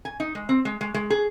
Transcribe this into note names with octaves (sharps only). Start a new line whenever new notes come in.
G#5
D#4
G#3
C4
G#3
G#3
G#3
G#4